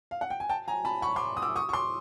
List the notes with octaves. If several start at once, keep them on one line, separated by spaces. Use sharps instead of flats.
F5
F#5
G5
G#5
G5 A5
G#5 A#5
A5 B5
B5 C#6
C6 D6
D#6
D6 E6
C#6 D#6
C#6
C6 D6